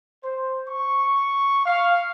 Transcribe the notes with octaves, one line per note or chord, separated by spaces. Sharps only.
C5
C#6
F5